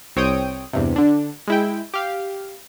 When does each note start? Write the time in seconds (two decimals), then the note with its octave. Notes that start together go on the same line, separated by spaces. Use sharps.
0.16 C2 C4 C#5 G5 D#6 D7
0.73 E2 G2 C3
0.96 D3 D4
1.48 G#3 E4 G5
1.94 G4 F5